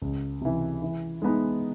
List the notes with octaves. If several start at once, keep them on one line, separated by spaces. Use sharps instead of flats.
C#2
C3 E3
E3
G#3 B3 D#4